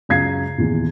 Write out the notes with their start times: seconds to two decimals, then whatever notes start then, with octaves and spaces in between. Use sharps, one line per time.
0.09 C#2 F#2 F5 G#6 C7
0.58 D#1 E2